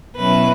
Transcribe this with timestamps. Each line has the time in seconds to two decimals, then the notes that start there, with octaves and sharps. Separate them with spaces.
0.16 B2 F#3 C#4 E4 B4